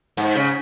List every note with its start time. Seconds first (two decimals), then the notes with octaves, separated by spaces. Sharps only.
0.17 G#2
0.35 C#3